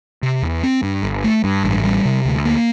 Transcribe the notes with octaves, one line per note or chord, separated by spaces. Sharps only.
C3
E2
C4
G2
G1
A3
G2
A1
G3
C3
D2
A#3